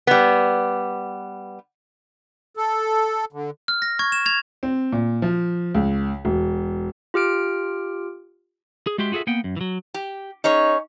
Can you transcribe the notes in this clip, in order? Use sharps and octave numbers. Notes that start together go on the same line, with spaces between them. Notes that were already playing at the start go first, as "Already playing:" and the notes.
G3 B3
A4
D3
F6
A#6
C#6 G#6
E7
G#6 F7
C4
A#2
F3
C#2
E1
F4 G4 F6 D7
G#4
G#3 F#4 G4 E5 C6
F4 F#4 G#4 A4 E5
A#3 B3 F#5 G5
F#2
E3 F#3
G4
C#4 D#4 G#4 C#5